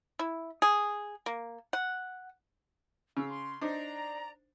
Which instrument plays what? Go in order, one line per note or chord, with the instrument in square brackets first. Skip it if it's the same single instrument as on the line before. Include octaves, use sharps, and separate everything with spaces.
[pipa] E4
G#4
A#3
F#5
[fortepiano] C#3 [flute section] F5 E6
[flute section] C6
[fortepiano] D4 D#4 C5 [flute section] D5 A#5